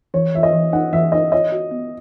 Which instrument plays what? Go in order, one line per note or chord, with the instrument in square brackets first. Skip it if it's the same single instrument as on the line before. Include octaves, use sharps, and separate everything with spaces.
[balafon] E3 [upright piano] C#5
[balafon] E3 [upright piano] E5
[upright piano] D#5
[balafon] E3
[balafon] D#4 [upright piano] F#5
[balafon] E3 [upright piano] E5
[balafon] D#4 [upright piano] D#5
[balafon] C#5 [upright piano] D#5
[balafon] F#4
B3